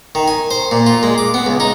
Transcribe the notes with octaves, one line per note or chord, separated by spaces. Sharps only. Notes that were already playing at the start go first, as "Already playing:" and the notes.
D#3
G#5
C5
A#2
F4
G#3
D6
B3
C#2
D#4